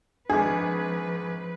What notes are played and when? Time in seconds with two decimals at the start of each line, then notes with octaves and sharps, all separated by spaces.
0.30 G#1 F3 D4 G#4 B4